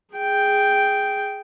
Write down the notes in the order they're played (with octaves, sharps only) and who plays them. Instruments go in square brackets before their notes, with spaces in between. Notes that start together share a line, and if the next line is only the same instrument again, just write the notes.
[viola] G#4 G5